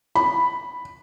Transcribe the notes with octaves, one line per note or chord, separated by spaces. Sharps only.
B5